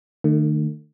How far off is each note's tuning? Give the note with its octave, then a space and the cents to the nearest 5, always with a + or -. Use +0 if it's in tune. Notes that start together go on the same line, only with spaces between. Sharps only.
D#3 -40 A3 +30